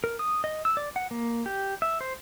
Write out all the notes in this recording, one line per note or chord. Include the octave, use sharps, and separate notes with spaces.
A#4
D#6
D#5
E6
D5
F#5
A#3
G4
E5
C5